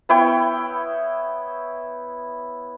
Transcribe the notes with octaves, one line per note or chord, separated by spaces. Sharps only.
B3 E4 C#5 G5